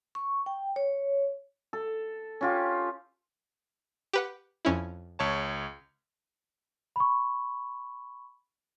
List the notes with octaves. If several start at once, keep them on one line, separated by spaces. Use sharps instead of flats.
C#6
G5
C#5
A4
C#4 F4 G4
G4 B4 F#5
F2 C#4 E4
C#2 C#5 A5
B5 C#6